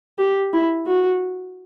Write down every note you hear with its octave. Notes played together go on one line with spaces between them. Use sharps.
G4
E4
F#4